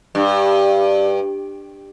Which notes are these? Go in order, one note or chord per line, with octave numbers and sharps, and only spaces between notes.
G2